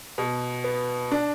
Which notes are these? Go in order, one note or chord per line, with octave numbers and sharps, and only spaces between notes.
B2
B3
D4